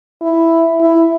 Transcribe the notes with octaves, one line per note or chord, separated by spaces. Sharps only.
E4
E4